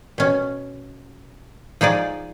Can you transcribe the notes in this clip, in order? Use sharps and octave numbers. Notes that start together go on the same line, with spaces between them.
B2 C#4
F3 D#4 G#4 D5